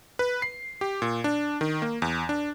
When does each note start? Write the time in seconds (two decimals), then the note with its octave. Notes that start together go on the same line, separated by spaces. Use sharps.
0.19 B4
0.42 C7
0.81 G4
1.02 A#2
1.24 D4
1.61 D#3
1.82 A#3
2.02 E2
2.29 D4